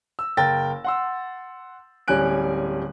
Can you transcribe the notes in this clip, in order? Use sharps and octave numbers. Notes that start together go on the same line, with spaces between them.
E6
F#1 A#4 G5 A6
F#5 C6 E6
D1 G3 C#4 G#5 F#6 D7